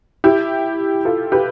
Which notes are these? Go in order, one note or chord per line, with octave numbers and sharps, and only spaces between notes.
E4 G4
F4 A4
G4 B4